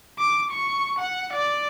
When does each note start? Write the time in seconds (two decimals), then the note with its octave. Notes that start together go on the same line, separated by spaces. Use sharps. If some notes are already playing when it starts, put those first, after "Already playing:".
0.19 D6
0.50 C#6
0.98 F#5
1.33 D5